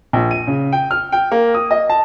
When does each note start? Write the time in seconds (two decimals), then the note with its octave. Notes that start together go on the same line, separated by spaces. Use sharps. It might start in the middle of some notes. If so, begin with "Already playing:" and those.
0.13 A#1
0.31 D#7
0.47 C#3
0.72 G5
0.91 F6
1.12 G5
1.32 A#3
1.55 D#6
1.71 D#5
1.89 A5